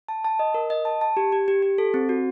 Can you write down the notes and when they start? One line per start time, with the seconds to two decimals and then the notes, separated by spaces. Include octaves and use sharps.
0.08 A5
0.25 A5
0.39 D#5
0.54 A#4
0.70 D#5
0.85 A5
1.01 A5
1.17 G4
1.32 G4
1.48 G4
1.63 G4
1.78 A4
1.94 C4
2.09 F#4